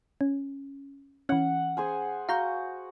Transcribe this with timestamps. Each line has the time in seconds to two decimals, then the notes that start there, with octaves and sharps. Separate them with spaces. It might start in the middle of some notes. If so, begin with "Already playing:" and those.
0.21 C#4
1.29 E3 C#4 F#5
1.77 G#4 C5 G#5
2.29 F#4 F5 A#5 G6